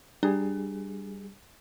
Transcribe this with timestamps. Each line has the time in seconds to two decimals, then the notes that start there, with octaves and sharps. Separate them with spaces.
0.23 G3 D4 G#4